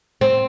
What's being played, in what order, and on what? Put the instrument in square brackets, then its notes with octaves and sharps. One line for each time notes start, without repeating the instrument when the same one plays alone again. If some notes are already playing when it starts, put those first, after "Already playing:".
[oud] C4